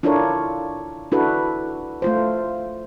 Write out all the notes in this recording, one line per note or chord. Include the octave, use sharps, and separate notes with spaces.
D4 E4 F4 A4 A#4 C#5
D4 E4 F#4 A4 B4
A3 F4 C5